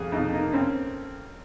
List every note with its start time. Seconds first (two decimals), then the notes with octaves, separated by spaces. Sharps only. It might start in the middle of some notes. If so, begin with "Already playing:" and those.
Already playing: F2 G#4
0.12 F2 D#4
0.33 A#3 D#4
0.53 C4 C#4